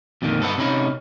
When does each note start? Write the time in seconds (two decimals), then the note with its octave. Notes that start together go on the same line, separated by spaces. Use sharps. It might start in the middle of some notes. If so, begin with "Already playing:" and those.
0.22 F2 A#2 D3 D#3
0.40 G2 A4 B4 F#5
0.58 C3 C#4 D#4 B5